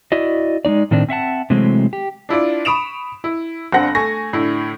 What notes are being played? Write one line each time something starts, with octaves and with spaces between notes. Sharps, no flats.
E4 F#4 D5 D#5
G#3 A#3 D#4 D5
A2 D#3 C4 D4
C4 E5 F#5 A5
C3 E3 F#3 G#3 A3 C4
G4
D4 E4 F4 D5
B5 C#6 D#6 D7 E7 F7
E4
G1 D3 C4 C5 F#5 A#6
A3 G#5 C#6 A#6
A2 D3 E4